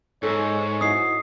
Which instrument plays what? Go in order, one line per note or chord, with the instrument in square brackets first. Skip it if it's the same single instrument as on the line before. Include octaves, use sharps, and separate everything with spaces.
[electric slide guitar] G#2 [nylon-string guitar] A4 [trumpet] C#5
[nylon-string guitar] D#4 E4 F#4 [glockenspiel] D#6 C7